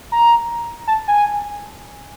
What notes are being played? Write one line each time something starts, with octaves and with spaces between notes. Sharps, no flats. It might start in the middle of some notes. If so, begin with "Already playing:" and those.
A#5
A5
G#5